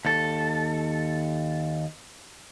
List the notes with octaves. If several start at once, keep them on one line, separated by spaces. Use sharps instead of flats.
D#2 A4